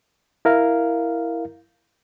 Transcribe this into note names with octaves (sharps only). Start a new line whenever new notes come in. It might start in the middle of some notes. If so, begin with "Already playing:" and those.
E4 A#4 F5